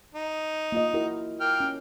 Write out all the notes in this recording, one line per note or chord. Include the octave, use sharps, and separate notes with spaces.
D#4
A#3 F4 D#5
E4 F#4 A#4
A#3 G5 F6
C#4